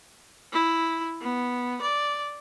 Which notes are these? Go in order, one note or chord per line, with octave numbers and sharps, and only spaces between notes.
E4
B3
D5